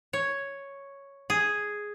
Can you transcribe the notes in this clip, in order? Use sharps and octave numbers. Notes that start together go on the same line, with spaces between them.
C#5
G#4